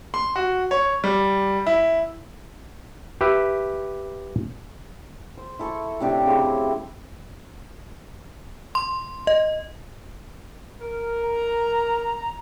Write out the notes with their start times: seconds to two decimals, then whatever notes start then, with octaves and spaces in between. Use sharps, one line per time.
0.14 C6
0.36 F#4
0.71 C#5
1.04 G3
1.67 E4
3.21 G4 B4 E5
5.37 C5
5.59 E4 A4 C#6
6.00 A2 C3 D4 G4
6.26 C#3 C4 E4
8.75 C6
9.27 D#5
10.81 A#4
11.27 A#5